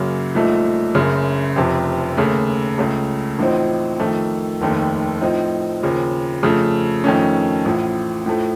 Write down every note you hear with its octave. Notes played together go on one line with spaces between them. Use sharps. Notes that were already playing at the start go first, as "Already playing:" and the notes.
Already playing: F#2 C#3 F#3 A#3
C2 A#2 F3 A3 D#4
F#1 F#2 C#3
F1 F2 C3
D#2 C#3 A3
C#2 C#3 A3
A1 A2 F3 C4 D#4
F2 D#3 A3
F1 D#2 D#3 A3
A2 F3 C4 D#4
D#2 C#3 F3
F2 C#3 F3 A3
F2 D#3 A3 C#4
A1 A2 F3
A2 F3 A3